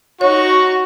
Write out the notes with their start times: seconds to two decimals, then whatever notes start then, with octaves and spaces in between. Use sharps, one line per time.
0.21 D#4 F#4 C#5 C#6